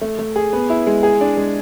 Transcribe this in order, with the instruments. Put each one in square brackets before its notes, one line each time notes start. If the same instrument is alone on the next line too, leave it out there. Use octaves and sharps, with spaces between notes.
[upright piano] A3
A3
G#4
B3
E4
G#3
G#4
D4
G#3